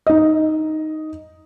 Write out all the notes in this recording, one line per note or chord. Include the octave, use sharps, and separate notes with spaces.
D#4 D#5